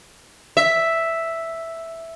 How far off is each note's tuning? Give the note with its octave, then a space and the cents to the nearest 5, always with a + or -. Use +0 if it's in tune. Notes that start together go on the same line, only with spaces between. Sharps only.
E5 +0